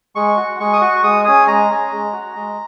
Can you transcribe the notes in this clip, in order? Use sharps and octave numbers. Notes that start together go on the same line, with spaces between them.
G#3 C#6
F#4
G#3 C#6
D#6
F#4 C#6
G#3 D#6
C#4 G#4 D#6
G#3 A#5
C#4 G#4
G#3
F#4
G#3